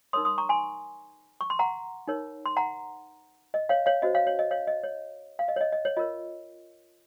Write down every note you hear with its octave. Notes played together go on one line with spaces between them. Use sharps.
D#4 A#4 C#5 C6 D#6
C6 D#6
A#5 C#6
G#5 C6
C#6
C6
F#5 A#5
D#4 A#4 C#5
C6
F#5 A#5
D#5
C#5 F5
C#5 F5
C#4 F#4 C5 D#5
C#5 F5
C#5
D#5
C#5 F5
D#5
C#5
F5
D#5
C#5
D#5
D#5
C#5
F4 A#4 C#5 D#5